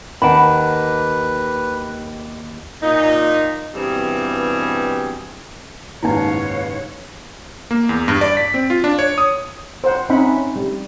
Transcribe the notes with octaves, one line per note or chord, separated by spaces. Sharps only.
D#2 B4 F#5 A5 B5 D7
A#2 D#4
G2 B2 E3 G3 C4 G#4
F#1 D#2 G#2 D#4 E4 B4 C#5 F5
A#3
E2
G2
D5
B6
C4
F4
D4
C#5
D#6
C5 F#5
C4 C#4 D#4 E5 F#5 B5
G3